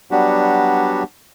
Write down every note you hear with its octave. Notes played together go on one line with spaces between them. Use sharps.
F#3 G3 B3 D4 F#4 G4